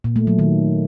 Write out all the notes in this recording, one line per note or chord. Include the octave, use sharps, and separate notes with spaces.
A#2
A3
F#3
D#3